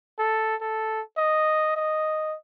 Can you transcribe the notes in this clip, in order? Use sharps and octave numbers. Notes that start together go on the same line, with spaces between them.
A4
A4
D#5
D#5